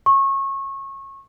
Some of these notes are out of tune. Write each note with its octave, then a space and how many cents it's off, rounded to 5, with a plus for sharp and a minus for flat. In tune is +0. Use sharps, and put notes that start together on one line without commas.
C#6 -25